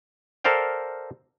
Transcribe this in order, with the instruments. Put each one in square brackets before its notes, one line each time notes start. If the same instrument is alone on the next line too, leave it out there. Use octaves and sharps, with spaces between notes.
[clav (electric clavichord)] A4 A#4 C5 D5 F5 G5